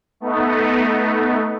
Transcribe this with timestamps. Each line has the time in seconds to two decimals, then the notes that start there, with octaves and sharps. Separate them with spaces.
0.20 A3 B3 D#4